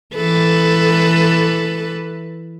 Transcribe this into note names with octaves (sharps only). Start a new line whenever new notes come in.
E3 A4 B4